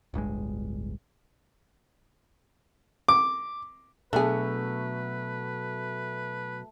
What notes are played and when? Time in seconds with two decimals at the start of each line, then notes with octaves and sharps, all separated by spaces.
0.14 D1 G1 G2 G#3
3.08 D6
4.13 B2 F#3 A3 B3 D4 G#4 B4